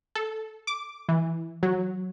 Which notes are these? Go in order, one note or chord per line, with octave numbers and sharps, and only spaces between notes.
A4
D6
E3
F#3